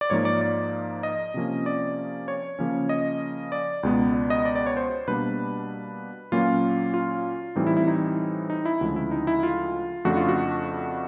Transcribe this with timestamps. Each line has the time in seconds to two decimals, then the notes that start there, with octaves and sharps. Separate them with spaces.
0.01 D5
0.10 G#2 F3 A#3 D#4 C#5
0.25 D5
0.41 D5
1.03 D#5
1.34 C3 F3 A#3 C#4
1.66 D5
2.28 C#5
2.59 C#3 F3 A#3 C#4
2.89 D#5
3.52 D5
3.83 C#2 B2 G#3 B3
4.14 D5
4.30 D#5
4.45 D5
4.55 D5
4.66 C#5
4.77 C5
5.08 B2 G3 A#3 D4 B4
6.32 A#2 F#3 A#3 C#4 F4
6.94 F4
7.56 A2 E3 G3 C4 D#4
7.67 E4
7.77 E4
7.87 D#4
8.50 D#4
8.65 E4
8.81 D2 C#3 F3 G#3
8.96 E4
9.11 D#4
9.27 E4
9.43 F4
10.05 F2 C#3 F3 A3 D4 F#4
10.17 F4
10.29 F#4